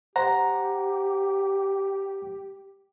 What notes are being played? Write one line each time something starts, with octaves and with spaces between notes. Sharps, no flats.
G4 C5 F#5 A#5